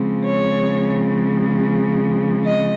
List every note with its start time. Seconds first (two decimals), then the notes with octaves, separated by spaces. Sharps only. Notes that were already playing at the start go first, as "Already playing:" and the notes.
Already playing: C#3 F3 G#3 C4
0.23 C#5
2.45 D#5